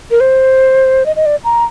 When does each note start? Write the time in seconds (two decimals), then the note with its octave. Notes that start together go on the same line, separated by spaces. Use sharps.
0.11 A#4
0.20 C5
1.06 D#5
1.16 D#5
1.26 D5
1.44 A#5